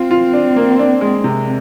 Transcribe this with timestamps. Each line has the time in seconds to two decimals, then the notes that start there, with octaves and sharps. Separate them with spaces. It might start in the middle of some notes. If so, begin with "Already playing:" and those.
Already playing: C4 F4
0.11 F4
0.33 D4
0.56 A#3
0.79 D4
1.01 G#3
1.24 C3